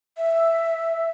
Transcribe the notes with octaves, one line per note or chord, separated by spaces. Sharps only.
E5